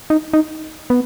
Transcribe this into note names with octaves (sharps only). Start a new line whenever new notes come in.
D#4
D#4
B3